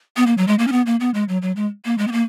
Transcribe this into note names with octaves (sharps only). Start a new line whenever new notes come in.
B3
A#3
F#3
G#3
A#3
C#4
B3
A#3
B3
G#3
F#3
F#3
G#3
A#3
G#3
B3
A#3